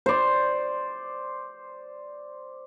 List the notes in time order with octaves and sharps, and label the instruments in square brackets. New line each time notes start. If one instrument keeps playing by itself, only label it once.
[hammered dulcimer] C5 D5